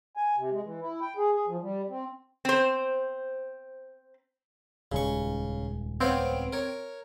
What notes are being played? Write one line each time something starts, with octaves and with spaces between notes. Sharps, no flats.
G#5
C3
G#3
E3
E4
G5
G#4
G#4
F3
G3
C4
C4 C5
D#1 C#2 C#3 G#3 C#6
B3 C4 C#5 F5 D7
A#4 C#5